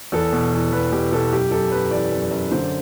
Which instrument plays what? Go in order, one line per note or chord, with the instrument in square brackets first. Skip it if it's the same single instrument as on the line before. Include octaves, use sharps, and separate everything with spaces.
[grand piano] E2 A4
B2
E2
E2 B4
B2 G4
B2 A4
F#2 G4
F#2 A4
F#2 B4
E3 D5
F#2
D5
F#2
D3 C5